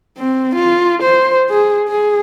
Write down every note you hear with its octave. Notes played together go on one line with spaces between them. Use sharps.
C4
F4
C5
G#4
G#4